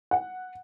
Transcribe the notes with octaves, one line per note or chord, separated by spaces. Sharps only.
F#5